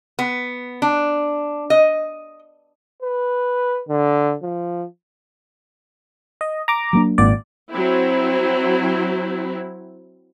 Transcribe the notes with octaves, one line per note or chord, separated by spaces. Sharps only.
B3
D4
D#5
B4
D3
F3
D#5
A#5 D6
F#3 A#3 D4
G#1 A#2 D5
F#3 C4 E4